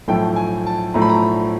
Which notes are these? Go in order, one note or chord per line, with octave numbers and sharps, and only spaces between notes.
B1 A2 F3 A3 G5
G#5
A5
B1 A2 F3 A3 A#5
B5
A#5